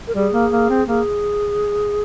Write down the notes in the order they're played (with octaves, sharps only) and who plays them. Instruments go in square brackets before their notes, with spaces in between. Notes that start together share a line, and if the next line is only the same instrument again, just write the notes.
[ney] A#4
[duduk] G3 [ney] G#4
[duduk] A#3
A#3
C4
[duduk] A#3 [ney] G#4